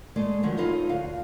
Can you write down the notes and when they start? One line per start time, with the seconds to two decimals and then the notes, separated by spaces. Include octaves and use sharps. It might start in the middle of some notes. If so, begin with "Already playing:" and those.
0.16 G#3 A3 D5
0.43 D3 D#3 F3 F#3
0.57 D#4 F4 A4 B4 C#5 D#5
0.89 D2 F5